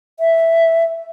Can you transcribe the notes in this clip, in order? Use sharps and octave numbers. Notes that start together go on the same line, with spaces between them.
E5